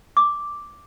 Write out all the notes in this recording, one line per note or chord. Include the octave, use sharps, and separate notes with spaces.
D6